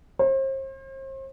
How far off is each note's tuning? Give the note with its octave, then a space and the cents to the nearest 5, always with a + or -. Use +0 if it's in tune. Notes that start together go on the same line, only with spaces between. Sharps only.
C5 +40